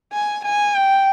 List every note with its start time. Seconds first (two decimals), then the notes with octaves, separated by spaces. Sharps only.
0.13 G#5
0.45 G#5
0.75 G5